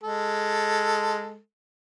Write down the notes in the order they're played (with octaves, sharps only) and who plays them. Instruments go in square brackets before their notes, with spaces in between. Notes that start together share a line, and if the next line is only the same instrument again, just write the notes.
[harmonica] G#3 A4